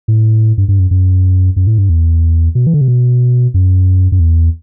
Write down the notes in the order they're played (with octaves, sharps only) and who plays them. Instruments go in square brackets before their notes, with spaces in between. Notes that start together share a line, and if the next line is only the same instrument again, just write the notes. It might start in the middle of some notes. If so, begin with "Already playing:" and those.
[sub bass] A2
G2
G2
F#2
F#2
F#2
A2
G2
E2
B2
E3
D3
C3
B2
F#2
F#2
E2